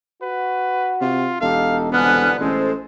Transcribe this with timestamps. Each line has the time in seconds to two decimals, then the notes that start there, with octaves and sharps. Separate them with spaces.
0.22 F#4 B4
1.01 C3 F4
1.41 E1 D#4 G4 A4 F5
1.93 C2 F2 D3 B3 G#5 F6 F#6
2.40 A1 G#3 A4 C5